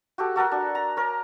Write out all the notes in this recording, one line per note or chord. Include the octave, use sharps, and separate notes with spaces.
F#4 G4 A4
F#4 A4 A#4 F#5
D4
A#5
A#4 C#5